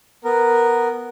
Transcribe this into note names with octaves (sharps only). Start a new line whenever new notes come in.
B3 A#4